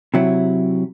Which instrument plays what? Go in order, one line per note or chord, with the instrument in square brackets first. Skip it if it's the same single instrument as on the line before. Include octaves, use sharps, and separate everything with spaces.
[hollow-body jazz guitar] C3 F#3 E4